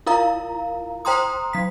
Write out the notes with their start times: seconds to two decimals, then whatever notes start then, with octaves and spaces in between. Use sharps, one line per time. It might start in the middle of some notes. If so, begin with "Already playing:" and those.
0.07 E4 F4 A#4 F5 A#5
1.05 C5 G5 A#5 C6 D#6
1.53 F#3 B6